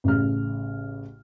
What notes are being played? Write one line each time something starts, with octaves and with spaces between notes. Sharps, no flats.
A1 C#3 F6